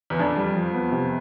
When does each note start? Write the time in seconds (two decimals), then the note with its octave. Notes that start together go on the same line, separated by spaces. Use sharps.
0.10 E2
0.19 F2 D4
0.37 G3
0.56 F3
0.74 B3
0.92 C3